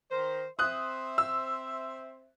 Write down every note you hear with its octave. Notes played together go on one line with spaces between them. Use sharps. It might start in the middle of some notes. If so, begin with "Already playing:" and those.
D#3 A#4 C5
C4 C5 E5 D#6 F#6
E6